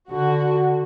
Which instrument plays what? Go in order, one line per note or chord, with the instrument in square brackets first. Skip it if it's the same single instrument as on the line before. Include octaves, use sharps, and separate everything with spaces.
[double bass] D3 [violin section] F#4